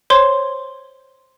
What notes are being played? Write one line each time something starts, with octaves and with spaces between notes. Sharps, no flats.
C5 C#5 C6